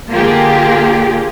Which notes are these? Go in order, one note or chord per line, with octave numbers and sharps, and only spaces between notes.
D3 A#3 F4 G4 G#4